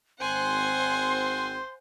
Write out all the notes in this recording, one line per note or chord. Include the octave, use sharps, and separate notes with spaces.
G#1 C4 C5 F#5 G#5 C6